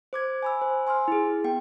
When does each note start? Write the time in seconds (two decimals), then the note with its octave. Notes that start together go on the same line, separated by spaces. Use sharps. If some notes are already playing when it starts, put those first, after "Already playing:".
0.13 C5 D6 G#6
0.43 G#5 B5 E6
0.62 C5
0.87 G#5 C6 E6 F6
1.08 E4 G#4
1.44 B3 G5